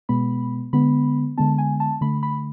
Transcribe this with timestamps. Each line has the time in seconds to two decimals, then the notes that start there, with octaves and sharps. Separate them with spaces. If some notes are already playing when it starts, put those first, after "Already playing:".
0.09 B2 G#3 B3 B5
0.73 D3 G#3 B3 B5
1.38 D3 G#3 B3 A5
1.58 G#5
1.80 A5
2.01 D3 A3 B5
2.23 B5